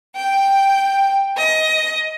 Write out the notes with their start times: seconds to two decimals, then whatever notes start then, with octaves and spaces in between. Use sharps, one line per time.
0.16 G5
1.38 D#5